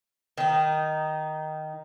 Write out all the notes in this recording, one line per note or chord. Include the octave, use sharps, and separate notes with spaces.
D#3 D#4